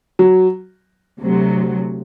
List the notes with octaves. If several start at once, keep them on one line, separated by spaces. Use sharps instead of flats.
F#3
D2 C3 F#3